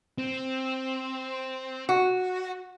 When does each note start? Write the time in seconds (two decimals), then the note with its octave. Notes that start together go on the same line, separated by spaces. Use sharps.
0.18 C4
1.89 F#4